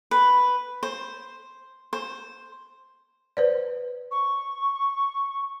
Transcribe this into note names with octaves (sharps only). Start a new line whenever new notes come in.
B4
C5
C5
B4 C5 D5
C#6